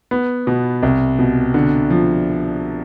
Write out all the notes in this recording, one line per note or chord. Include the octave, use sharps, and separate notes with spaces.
B3
B2
C2
B2
D3
F3